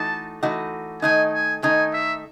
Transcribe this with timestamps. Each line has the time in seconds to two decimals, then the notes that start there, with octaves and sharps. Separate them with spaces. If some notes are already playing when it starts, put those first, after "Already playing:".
Already playing: E3 A3 D#4 F#4 A5
0.43 E3 A3 D#4 F#4
1.02 D#3 A3 D#4 G#5
1.33 G#5
1.63 D#3 A3 D#4 G#5
1.93 E5